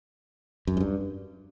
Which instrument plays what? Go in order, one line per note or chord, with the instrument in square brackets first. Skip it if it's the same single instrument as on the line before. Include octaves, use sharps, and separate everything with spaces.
[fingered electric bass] F#2
G#2
G2